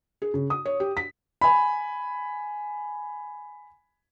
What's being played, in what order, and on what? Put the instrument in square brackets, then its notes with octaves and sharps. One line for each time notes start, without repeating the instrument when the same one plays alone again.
[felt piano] G#4
C#3
D#6
C#5
G4
B6
[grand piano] G#5 B5